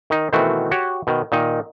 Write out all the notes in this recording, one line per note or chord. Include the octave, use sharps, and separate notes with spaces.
D#3 D#4
B2 D#3 E3 A3 C4 F#4
F#4 G4 C#5
B2 D#3
A#2 D#3 D#4